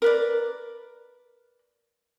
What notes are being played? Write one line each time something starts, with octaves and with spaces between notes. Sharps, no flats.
A#4 B4 D5